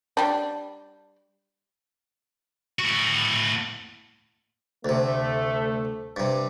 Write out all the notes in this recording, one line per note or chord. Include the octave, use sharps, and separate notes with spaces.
G3 D4
A2 F#4
D2 C3 A3
G2 C3